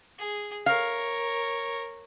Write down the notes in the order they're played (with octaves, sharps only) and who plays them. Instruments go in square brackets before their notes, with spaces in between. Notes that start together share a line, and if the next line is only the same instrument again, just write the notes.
[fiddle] G#4
[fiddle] A#4 C#5 [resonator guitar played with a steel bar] F5